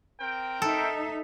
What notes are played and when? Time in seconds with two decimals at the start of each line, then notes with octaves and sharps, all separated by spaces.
0.20 C4 A#4 G5
0.62 D#4 A4 E5